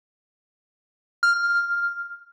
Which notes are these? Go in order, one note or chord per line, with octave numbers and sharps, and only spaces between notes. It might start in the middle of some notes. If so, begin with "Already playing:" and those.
F6